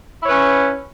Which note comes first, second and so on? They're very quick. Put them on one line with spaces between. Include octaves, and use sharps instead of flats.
E4 C#5 B4 C#4